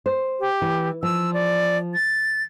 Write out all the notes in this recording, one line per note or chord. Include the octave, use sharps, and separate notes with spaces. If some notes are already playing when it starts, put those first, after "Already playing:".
C5
G4
E3
F3 E6
D5
A6